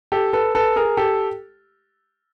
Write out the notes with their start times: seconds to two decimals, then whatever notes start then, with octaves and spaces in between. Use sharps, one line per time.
0.12 G4 A4
0.33 A4 B4
0.55 A4 B4
0.76 G#4 A#4
0.97 G4 A4